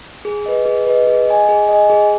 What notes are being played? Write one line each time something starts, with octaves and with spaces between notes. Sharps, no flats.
G#4
B4 D#5
G#4
B4 D#5
G#4
D#5 G#5
G#4
D#5 G#5
G#4